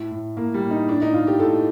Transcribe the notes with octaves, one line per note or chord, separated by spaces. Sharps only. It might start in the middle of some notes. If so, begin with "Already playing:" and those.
Already playing: A2
A2
A2 A#3
G3
A2
D#4
A2 D4
D#4
A2 F4
G4
A2 A4